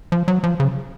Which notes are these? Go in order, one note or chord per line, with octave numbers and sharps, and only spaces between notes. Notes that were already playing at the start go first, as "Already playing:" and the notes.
F3
F#3
F3
C#3